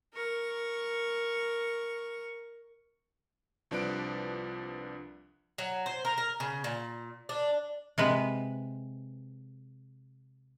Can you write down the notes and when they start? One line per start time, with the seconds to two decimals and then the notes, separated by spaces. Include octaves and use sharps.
0.13 A#4 C#6
3.71 C2 F3 D4 B4 F#6 D7
5.58 F#3
5.86 C5
6.05 A#4
6.18 A#4
6.40 C#3
6.64 A#2
7.29 D4
7.98 C3 G#3 B4